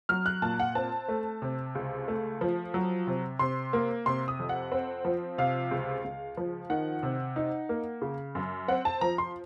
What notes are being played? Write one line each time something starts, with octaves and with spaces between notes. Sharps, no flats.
F#3 F6
F#6
A#2 A5
F#5
C4 A5
A3
C3
C#2
A3
F3
F#3
C3
C3 C6
A#3
C3 C6
D#6
F2
F#5
C4
F3
C3 F5
C#2
C#2
F3
D#3 F#5
C3
D#4
A#3
C#3
F#2
C4 F#5
A5
F3 A#5
C6